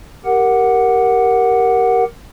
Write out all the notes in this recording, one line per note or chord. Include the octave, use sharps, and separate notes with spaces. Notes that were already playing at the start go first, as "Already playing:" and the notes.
G4 A#4 F#5